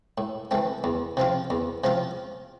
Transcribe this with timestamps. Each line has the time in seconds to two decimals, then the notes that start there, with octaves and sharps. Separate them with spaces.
0.18 A2
0.51 E3 A3 C4
0.84 E2
1.17 C3 F3 C4 F4
1.50 E2
1.84 C3 F3 C4 F4